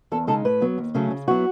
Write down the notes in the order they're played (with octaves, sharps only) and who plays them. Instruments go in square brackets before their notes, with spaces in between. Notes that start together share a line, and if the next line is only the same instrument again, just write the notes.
[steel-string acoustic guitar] E2 A4
C#3 G#3 D#4 A4
A2 B4
F#3 B3
D#2
C#3 F#3 A3 C#4
C#3
F#3 B3 E4 F#4